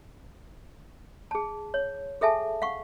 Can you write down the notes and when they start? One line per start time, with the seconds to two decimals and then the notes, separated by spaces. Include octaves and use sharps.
1.31 G#4 A5
1.74 C#5
2.21 G#4 A4 E5 G#5 A5
2.62 F5 F#5 C#6